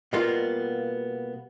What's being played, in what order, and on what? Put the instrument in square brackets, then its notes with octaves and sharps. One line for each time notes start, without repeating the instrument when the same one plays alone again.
[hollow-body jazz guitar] B2 G3 A#3 B3 F4